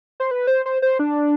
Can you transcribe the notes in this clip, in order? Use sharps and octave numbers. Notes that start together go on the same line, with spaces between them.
C5
B4
C5
C5
C5
D4